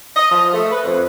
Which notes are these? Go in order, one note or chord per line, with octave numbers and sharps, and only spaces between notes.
D#5
F3
A3
B4
F2